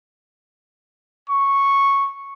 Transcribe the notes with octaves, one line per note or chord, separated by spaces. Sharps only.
C#6